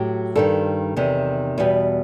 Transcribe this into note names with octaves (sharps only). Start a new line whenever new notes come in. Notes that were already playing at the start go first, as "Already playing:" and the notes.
Already playing: A2 F#3 G4
G2 D#3 G3 A4
E2 C3 D#3
E2 B2 G3